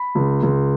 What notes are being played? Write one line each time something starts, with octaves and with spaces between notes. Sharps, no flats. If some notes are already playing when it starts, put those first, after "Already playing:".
Already playing: B5
C#2
C#2